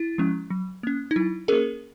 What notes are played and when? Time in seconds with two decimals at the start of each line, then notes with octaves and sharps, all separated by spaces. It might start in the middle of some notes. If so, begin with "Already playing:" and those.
Already playing: E4
0.18 F3 G#3 C#4
0.50 F#3
0.83 A#3 C#4
1.11 D#4
1.16 F#3 E4
1.48 A#3 C#4 G#4 A#4